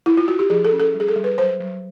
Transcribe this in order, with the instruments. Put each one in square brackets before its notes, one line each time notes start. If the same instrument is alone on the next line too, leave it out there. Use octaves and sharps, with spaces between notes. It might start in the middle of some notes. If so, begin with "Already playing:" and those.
[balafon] E4
F4
F#4
G4
F3 G#4
A4
C#4
A4
G3
G#4
A4
G3
B4
F#3 C5
F#3